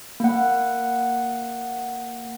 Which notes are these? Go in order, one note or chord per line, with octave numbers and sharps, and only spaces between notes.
A#3 F#5